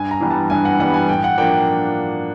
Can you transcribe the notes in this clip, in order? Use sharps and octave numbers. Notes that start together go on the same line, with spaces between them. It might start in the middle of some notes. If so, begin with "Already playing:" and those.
Already playing: G2 G#5
A#5
E3 G3 B3
A5
G2 G#5
F#5
E3 G3 B3 F#5
G#5
A2 G5
F#5
F3 A#3 D4 G5